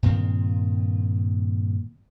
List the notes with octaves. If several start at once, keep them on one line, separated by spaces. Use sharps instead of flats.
G2 A#2 D#3 C4